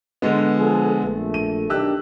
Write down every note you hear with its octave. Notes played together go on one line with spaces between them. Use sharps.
D3 G#3 B3
F3 G#4 A4
A#1 A3
D#7
B1 D#3 D4 G4 E6 F#6